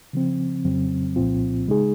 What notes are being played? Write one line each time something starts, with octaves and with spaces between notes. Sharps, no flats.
C#3 F3 C4
F2 C#3 F#3 C4
C2 A#2 F3 C4 F4
C#3 G#3 D#4 G#4